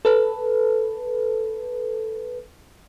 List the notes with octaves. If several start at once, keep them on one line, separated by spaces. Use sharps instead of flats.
A4 B4